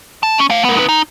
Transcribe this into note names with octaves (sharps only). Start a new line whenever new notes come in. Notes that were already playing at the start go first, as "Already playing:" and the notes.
A5
C#4
A3 F5
B3 A#4
D#4 B4
D#4